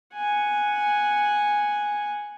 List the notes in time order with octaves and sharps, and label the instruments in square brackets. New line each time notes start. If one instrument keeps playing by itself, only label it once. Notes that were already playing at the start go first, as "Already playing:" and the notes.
[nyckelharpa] F#5 G#5